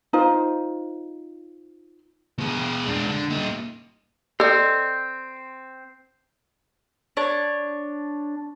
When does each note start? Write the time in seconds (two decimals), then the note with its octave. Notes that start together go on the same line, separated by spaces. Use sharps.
0.13 D#4 F4 C5
2.39 B2 G#4
2.86 G#3 D4
3.07 D3
3.30 A#2 D#4
4.40 C4 A4 D5 D#5
7.17 D4 C#5